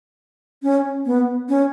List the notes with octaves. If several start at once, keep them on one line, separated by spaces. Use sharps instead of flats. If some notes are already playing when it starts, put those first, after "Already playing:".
C#4
B3
C#4